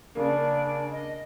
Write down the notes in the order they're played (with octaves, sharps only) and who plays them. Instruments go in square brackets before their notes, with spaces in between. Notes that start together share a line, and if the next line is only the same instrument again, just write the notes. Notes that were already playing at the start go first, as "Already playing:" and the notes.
[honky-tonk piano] C#3 A#3 [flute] D4
[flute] D#5